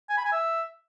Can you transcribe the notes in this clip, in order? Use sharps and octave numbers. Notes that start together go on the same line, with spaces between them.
G#5
B5
G#5
E5